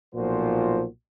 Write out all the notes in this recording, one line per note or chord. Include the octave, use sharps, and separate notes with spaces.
B1 A#2 F3 F#4 C5